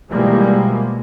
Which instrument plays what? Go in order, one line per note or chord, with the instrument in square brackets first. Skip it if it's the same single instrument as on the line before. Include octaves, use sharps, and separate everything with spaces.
[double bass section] B2 E3 F3 G3 G#3 A#3